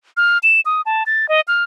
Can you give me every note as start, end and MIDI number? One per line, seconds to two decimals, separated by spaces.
0.17 0.38 89
0.43 0.61 100
0.65 0.82 87
0.86 1.03 81
1.06 1.29 93
1.29 1.41 75
1.48 1.64 89